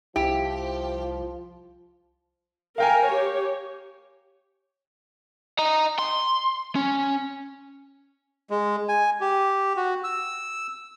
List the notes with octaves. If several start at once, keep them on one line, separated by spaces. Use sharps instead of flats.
C2 F3 E4 G4
A#4 F5 G5 G#5
G4 C#5
D#5 A#5
C6
C#4
G#3
G#5
G4
F#4
E6